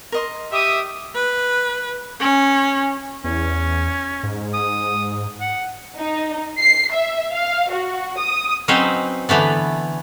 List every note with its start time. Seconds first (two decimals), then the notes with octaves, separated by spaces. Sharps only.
0.12 A#4 D#5 C6
0.52 G4 E5 D#6
1.15 B4
2.20 C#4
3.24 E2 C#4
4.23 G#2
4.54 D#6
5.41 F#5
5.97 D#4
6.59 C7
6.92 E5
7.32 F5
7.70 F#4
8.17 D#6
8.68 F#3 C4 C#4 D#4 B4 C5
9.29 D3 E3 A3 B3